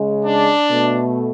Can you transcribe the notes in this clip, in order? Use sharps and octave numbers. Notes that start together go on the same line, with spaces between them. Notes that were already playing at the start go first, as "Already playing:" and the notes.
Already playing: C#3 G#3
D4
B2 A3